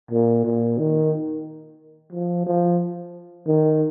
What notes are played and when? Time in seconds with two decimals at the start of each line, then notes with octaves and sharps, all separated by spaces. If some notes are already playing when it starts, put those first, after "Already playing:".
0.11 A#2
0.45 A#2
0.78 D#3
2.12 F3
2.46 F3
3.47 D#3